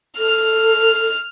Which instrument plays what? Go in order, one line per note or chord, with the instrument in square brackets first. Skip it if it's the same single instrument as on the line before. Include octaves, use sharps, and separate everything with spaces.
[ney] A4 [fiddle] F6